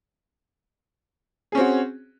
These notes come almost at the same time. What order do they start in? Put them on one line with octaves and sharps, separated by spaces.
G#4 C#4 C4 F#4